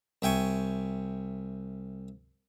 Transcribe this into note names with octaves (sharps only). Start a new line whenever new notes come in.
C2 E5 G5 G#5 C#6